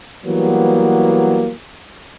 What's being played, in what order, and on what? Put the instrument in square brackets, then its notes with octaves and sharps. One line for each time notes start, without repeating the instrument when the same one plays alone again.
[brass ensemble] E3 F#3 G3 A#3 B3